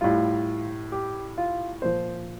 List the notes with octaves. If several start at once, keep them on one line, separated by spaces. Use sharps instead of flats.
A2 G3 F4
G4
F4
A#2 F3 C5